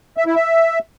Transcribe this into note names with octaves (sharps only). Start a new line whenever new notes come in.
E5
E4
E5